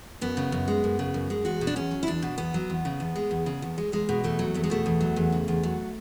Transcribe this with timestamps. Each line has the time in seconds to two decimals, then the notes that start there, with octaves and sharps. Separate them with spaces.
0.21 F#2 B3
0.37 C#3
0.52 F#2
0.68 G#3
0.84 F#2
0.99 C#3
1.14 F#2
1.30 G#3
1.45 E2 F#4
1.61 B2
1.67 D4
1.76 E2 C#4
1.91 F#3
2.03 E4
2.07 E2 D4
2.22 B2
2.38 E2 B3
2.54 F#3
2.70 E2
2.85 C#3
3.00 E2
3.16 G#3
3.31 E2
3.46 C#3
3.62 E2
3.78 G#3
3.92 E2 G#3
4.09 B2
4.24 E2 A3
4.39 F#3
4.54 E2 A3
4.64 G#3
4.70 B2 A3
4.86 E2
5.01 F#3
5.16 E2
5.32 C#3
5.48 E2
5.63 F#3